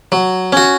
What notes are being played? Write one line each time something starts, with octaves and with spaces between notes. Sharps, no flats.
F#3
C#4 F#4